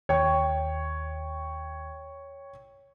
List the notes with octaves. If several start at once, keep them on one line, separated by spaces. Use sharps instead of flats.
D#2 C#5 G5 C#6